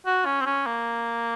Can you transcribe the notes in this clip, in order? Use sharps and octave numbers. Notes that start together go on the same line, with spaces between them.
F#4
C#4
C4
C#4
A#3